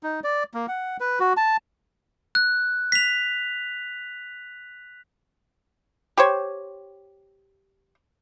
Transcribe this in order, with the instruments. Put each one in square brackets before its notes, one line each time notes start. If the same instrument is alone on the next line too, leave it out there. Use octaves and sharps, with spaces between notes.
[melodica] D#4
D5
A#3
F#5
B4
F#4
A5
[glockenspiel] F#6
B6 F7
[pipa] G4 C5 C#5